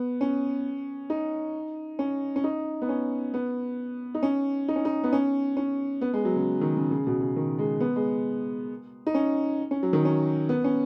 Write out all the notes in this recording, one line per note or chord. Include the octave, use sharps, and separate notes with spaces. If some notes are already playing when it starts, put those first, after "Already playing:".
Already playing: B3
C#4
D#4
C#4
C#4
D#4
B3
C#4
B3
D#4
C#4
D#4
C#4
D#4
B3
C#4
C#4
B3
G#3
F#3
C#3
D#3
C#3
C#3
B2
C#3
D#3
G#3
B3
G#3
D#4
C#4
C#4
F#3
D#3
C#4
B3
C#4